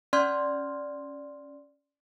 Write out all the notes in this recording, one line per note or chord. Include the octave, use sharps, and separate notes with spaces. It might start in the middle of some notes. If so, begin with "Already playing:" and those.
C#4 D5 C6 F6 G#6